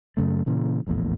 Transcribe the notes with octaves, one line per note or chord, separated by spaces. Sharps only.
F#2 C#3 A3
A#2 C#3 E3
F1 A#1 E2 A2